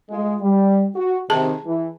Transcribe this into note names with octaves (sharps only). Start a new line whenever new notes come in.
G#3 F4
G3
F#4
C3 D#3 G#4 A5
E3